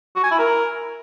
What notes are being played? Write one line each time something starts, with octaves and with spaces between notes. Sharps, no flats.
F#4
G#5
E4
A#4